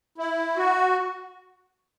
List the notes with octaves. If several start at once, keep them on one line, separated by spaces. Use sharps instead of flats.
E4
F#4